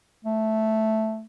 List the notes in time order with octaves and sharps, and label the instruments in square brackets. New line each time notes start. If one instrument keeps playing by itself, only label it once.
[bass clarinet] A3